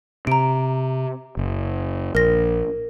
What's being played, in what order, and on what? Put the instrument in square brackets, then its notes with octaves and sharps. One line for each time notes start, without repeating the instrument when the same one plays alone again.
[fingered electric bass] C3 [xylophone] A#5 D7
[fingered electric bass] F#1
[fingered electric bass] A#1 [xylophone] A#4 A#6